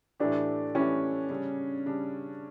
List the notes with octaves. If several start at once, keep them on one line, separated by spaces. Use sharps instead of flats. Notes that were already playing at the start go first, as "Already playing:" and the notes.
A2 E3 A3 D4 E4 G4
A2 E3 A3 C#4 E4 G4
C#3 G3 D4
C#3 G3 D4